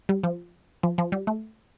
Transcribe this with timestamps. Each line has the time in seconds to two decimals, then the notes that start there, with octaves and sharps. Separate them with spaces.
0.09 G3
0.24 F3
0.83 F3
0.98 F3
1.12 G3
1.27 A3